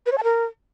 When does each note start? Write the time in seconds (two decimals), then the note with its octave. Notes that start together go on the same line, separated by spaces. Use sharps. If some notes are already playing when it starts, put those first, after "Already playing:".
0.06 B4
0.12 C#5
0.18 A5
0.24 A#4